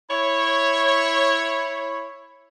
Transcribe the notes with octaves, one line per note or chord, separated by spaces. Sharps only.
E4 C#5